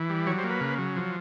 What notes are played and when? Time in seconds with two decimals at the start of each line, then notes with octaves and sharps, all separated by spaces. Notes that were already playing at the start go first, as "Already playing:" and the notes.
Already playing: E3
0.09 G3
0.27 F#3 C#5
0.38 C5
0.44 A#3
0.50 B4
0.61 C#3
0.79 F#3
0.96 F3